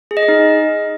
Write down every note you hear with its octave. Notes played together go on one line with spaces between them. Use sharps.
G#4
D#5
G#4
D#4